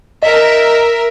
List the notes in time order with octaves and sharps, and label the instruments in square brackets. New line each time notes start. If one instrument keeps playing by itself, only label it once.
[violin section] A#4 E5 [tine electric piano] D#5